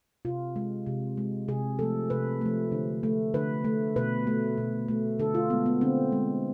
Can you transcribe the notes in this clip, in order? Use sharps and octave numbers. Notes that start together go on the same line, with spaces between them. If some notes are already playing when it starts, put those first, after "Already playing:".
C3 F4
G#3
C3
G#3
C3 G#4
F3 A3 A4
C3 B4
F3 A3
D3
A3
D3 B4
A3
B2 B4
A3
B2
A3
D3 A4
F4
G#3 B3
B3
D3 C4
G#3